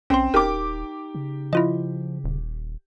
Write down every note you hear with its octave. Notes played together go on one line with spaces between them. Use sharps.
B1 C4 C#4 C6
D#1 D#4 G4 A#4 D6
C#3
F3 E4 F4 D#5
D#1